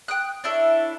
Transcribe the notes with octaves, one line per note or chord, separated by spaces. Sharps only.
G5 D#6 F#6
D4 E4 A4 C#5